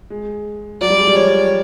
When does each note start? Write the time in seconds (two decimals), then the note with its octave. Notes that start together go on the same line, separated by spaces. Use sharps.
0.10 G#3
0.81 F#3 D5
0.90 G3
0.98 G#3
1.07 G3
1.16 F3 C#5